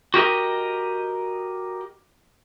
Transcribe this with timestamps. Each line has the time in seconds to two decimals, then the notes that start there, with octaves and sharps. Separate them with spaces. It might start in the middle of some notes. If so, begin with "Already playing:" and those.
0.14 F#4 G4 A#4 D#5